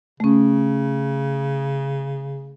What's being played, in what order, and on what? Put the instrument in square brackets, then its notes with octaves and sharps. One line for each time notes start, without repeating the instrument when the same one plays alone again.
[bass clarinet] C#3 [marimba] A3 C#4